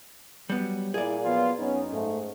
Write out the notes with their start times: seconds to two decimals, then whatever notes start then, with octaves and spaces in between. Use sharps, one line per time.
0.50 F#3 G3 B3
0.94 A#2 E4 G#4 D5
1.24 F3 F#3 B3 F4
1.58 F#2 B3 C#4 D#4
1.93 G#2 A3